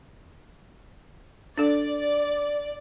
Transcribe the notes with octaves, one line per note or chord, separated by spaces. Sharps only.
D4 A4 D5